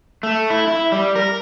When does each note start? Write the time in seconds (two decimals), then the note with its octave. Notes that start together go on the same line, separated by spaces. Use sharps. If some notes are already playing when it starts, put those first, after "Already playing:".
0.23 A3
0.50 E4
0.68 E4
0.92 G3
1.16 A#4